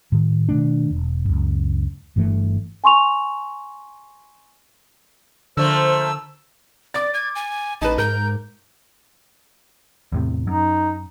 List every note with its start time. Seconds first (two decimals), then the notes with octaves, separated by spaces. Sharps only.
0.12 A2 D#3
0.49 B2 D#3 A3 D4
0.91 E1
1.25 C#2 F#2
2.16 G1 G2 E3 A3
2.84 G#5 C6 C#6 F7
5.57 D3 F3 A3 A#3 C5 E6
6.94 D5 D6 A6
7.14 G#6
7.35 G#5
7.81 A1 D#4 B4 A5
7.98 G#2 A#4 G6
10.12 E2 A2 C3
10.47 F#2 D#4